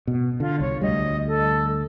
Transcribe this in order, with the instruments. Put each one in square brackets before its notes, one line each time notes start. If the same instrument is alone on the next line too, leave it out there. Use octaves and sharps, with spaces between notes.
[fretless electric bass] B2
[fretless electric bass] D3 [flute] F4
[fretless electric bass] C2 [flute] C#5
[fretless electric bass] D2 G3 [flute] D#5
[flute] A4